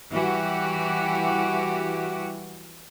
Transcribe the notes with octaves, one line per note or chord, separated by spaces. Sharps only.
E3 G3 F#4 G4